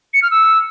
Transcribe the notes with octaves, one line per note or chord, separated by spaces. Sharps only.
C#7
F6
E6